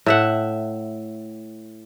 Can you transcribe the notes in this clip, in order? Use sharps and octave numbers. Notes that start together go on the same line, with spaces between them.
A2 E5 F#5